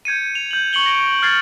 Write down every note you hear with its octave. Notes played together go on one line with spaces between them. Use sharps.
G6 G#6 C#7 D#7
F7
G6 F#7
C#6 C#7 F#7 G7
A#6 D7 D#7 G7
F6 G#6 A6 C7